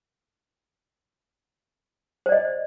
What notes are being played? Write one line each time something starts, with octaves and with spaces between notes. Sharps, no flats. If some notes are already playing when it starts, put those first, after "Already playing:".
C5 D5 D#5